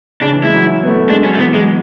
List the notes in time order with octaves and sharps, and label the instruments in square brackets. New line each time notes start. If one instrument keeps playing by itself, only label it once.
[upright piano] C#3 [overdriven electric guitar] D4
[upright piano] E3
[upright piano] G#3 [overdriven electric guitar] E4
[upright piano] F#3
B3
A3
[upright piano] G#3 [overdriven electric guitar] D4
[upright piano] F#3 [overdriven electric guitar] C#4
[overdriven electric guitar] A3
[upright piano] E3 [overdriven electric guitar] B3
[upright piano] F#3 [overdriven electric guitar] G#3